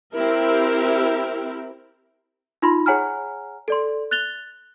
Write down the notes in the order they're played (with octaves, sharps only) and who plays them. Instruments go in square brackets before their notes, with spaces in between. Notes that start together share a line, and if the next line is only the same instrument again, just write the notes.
[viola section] C4 E4 G4 A#4
[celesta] D#4 F4 B5 C6
G#4 C#5 F#5 G#5 A#5 F6
A4 D5 C6
F#6 A6 F7 G7